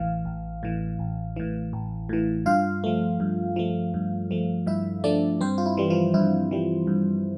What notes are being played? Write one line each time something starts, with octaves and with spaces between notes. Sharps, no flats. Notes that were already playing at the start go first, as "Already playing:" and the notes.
Already playing: A1 A2 E3 F5
A1
A2 E3
A1
A2 E3
A1
A2 E3
G2 F4 F5
F3 A3
G2
F3 A3
G2
F3 A3
G2 E4 E5
F3 A3 D4 D5
G2 C4 C5
F4
E4
E3 G3
F3 F4
G2 E4
E3 G3
G2